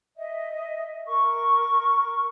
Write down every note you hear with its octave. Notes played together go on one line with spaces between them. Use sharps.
D#5 E5
A#4 C#6